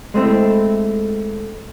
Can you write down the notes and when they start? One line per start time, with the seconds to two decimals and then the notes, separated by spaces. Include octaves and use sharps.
0.14 G#3 A3 C4 E4